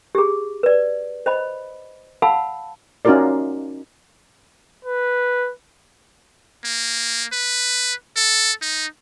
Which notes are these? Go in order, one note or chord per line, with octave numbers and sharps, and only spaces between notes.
G4 G#4
B4 D5
C5 D#5 B5
F5 F#5 A5 B5 E6
C#4 D#4 F4 F#4 A#4 D5
B4
A#3
B4
A4
D#4